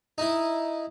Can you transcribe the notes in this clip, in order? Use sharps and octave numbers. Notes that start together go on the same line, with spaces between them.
D#4 E4